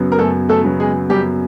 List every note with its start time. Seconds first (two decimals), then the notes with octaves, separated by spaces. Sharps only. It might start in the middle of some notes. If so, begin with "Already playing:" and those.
Already playing: F#2 C#3 F#3 B3
0.12 A#4
0.18 F#2 A3 A4
0.49 A3 A4
0.64 C#3 F#3 B3
0.80 G#3 G#4
1.10 F#2 G3 G4